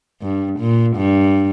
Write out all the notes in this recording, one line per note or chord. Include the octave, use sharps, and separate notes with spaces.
G2
A#2
G2